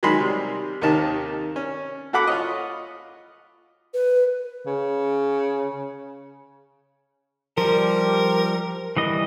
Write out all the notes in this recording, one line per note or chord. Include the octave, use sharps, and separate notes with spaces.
D#3 F#3 G#3 D#4 B5 C6
C3 G3
D#2 C3 D#3 D#4 A5
C#4
F#4 A4 F#5 B5 D6
F4 C#5 D#5
B4
C#3
F3 G3 A#4
E3 G3 D#5